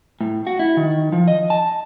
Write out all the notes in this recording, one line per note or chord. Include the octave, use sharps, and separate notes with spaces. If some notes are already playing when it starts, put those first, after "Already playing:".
A2
F#4
E4
D#3
F3
D#5
A5